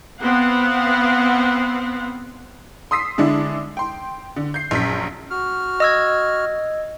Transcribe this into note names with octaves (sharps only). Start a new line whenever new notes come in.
B3 C4 F5 F#5
C6 D#6 E6 B6 C7
D3 G#3 D4 E4
G5 C6
D3
G6 C7
A#1 F#2 B6
F#4 F6
D#5 E6 G#6